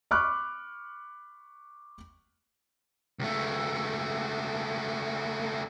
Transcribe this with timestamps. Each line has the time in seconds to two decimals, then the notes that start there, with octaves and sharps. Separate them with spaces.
0.11 B5 C#6 D6 F6 F#6
3.19 C#2 A3